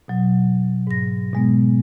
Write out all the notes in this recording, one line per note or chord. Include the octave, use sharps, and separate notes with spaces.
B2 F#3
G#2 A#6
B2 G#3 B3